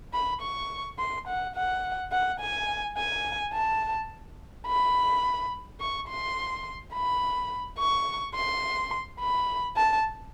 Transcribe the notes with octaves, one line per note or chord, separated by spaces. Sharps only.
B5
C#6
C6
F#5
F#5
F#5
G#5
G#5
A5
B5
C#6
C6
B5
C#6
C6
B5
A5